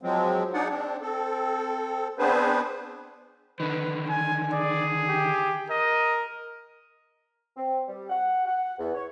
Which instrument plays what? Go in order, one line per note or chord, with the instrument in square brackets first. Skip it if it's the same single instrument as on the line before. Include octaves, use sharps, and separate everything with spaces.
[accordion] F3 F#3 G#3 C4
D4 D#4 G#4 D5 F#5
C4 D4
C4 A4
B3 C4 D4 G#4 B4 C5
[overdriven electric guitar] D3 D#3 [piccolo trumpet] B4
[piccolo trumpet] G#5
[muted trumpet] G#4 [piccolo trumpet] D5
[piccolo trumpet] G4
[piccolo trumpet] A#4 [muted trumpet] D#5
[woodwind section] C4
G3
F#5
F#5
E2
C#5